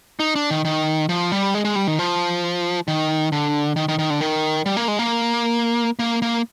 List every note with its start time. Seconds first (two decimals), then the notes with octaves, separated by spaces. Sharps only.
0.20 D#4
0.36 D4
0.50 D#3
0.65 D#3
1.09 F3
1.32 G3
1.54 G#3
1.65 G#3
1.75 G3
1.87 D#3
1.99 F3
2.88 D#3
3.32 D3
3.76 D#3
3.88 D#3
3.99 D#3
4.10 D3
4.21 D#3
4.66 G3
4.77 A#3
4.88 G#3
4.99 A#3
5.99 A#3
6.22 A#3